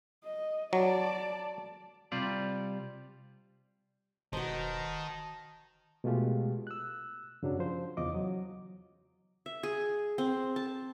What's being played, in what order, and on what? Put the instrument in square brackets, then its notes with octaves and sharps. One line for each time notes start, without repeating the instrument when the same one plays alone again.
[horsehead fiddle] D#5
[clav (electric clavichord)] F#3 [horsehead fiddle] D5 A5
[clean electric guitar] C3 G3 F4 D5
[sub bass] E1 [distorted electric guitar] D#3 [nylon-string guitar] F#4 B4 C5 [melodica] D#5 A5 A#5
[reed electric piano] B2 G#3 A3 F4 G4
E6 F#6
F#2 C#3 F#3 D4
F3 C5
E2 C#3 F4 D#5 D6
F#3
[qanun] E5
G#4
C4
A5